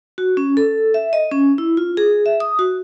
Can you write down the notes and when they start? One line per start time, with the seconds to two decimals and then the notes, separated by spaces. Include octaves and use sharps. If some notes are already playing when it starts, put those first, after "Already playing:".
0.18 F#4
0.37 C#4
0.57 A4
0.94 E5
1.13 D#5
1.32 C#4
1.58 E4
1.77 F4
1.97 G#4
2.26 E5
2.40 D#6
2.59 F#4